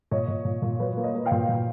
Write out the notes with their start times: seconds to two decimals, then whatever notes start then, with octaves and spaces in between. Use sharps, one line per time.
0.11 A#2 C#5 D#5
0.28 A#2
0.45 A#2
0.62 A#2
0.80 F#3 B4 C#5
0.97 A#3
1.03 C#5 D#5
1.15 A#3
1.26 F5 G5
1.32 A#2
1.49 A#2